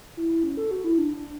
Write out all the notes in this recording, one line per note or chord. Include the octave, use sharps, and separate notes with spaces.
E4
C#4
A4
F#4
E4
D4